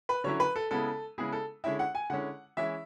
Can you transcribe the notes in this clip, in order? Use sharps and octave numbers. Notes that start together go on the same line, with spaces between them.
B4
D3 F#3 C#4 E4 C#5
B4
A4
C#3 G#3 B3 E4 A4
C#3 G#3 B3 E4 G#4
A4
D3 G#3 C#4 E4 E5
F#5
G#5
D3 G#3 C#4 E4 F#5
E3 G#3 C#4 E4 E5